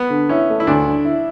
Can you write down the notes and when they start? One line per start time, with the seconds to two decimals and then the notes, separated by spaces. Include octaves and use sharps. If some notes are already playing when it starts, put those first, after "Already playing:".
Already playing: B3
0.10 D3
0.29 C#4 E4
0.49 A3
0.60 E4
0.67 D2 D4
0.86 D3
1.05 E4